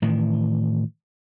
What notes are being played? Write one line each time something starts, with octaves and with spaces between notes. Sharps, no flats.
A2 D#3 E3